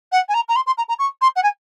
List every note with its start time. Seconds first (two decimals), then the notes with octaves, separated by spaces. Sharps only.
0.12 F#5
0.28 G#5
0.34 A#5
0.48 A#5
0.56 C6
0.66 C6
0.77 A#5
0.88 A#5
0.99 C#6
1.21 C6
1.36 F#5
1.43 G#5